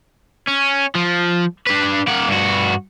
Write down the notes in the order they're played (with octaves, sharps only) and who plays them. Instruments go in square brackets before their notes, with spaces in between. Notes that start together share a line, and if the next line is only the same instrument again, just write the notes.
[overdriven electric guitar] C#4
F3
D4 B4
A#3 F#5
G2 F#4